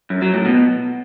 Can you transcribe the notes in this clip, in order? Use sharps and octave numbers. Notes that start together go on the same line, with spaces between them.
F#2
F#3
A2
B2